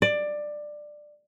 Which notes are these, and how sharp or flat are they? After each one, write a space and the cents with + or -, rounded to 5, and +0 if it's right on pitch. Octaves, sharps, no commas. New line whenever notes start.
D5 +15